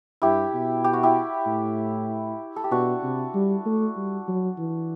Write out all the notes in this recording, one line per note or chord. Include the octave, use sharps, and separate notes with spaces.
G2 E4 G4
B2
G4
F#4
E4 G4
A2
A4
G4
B2 D4 F#4
C3
G3
A3
G3
F#3
E3